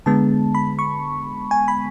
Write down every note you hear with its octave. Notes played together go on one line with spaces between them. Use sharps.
D3 G#3 B3 A5
B5
C#6
G#5
B5